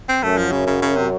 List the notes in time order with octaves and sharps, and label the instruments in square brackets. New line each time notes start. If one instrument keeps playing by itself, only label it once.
[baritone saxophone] C4
[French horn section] F#2 [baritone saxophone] A3
[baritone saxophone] F3
C#3
C#3
C#3
C3